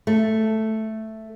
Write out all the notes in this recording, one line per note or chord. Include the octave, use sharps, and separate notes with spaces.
A3